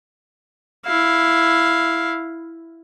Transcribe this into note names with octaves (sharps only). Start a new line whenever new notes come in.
E4 F5